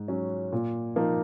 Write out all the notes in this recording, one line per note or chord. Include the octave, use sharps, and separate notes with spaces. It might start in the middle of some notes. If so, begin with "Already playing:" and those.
Already playing: G#2
F#3 C#4
A#2
F3 A#3 D#4